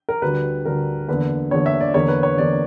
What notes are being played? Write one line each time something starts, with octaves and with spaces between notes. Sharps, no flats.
A#4
D2 D3 G3 B4
D2 D3 G3 A#4
E2 D3 A#3 B4
E2 D3 A#3 C#5
E5
D5
E2 D3 A#3 C#5
B4
C#5
E2 D3 A#3 D5